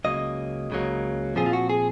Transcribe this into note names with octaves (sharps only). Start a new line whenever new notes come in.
C#2 C#3 F#3 A#3 D#5
C#2 C#3 F#3 A#3
A#2 F3 C4 F4 G#4
F4
F#4
G#4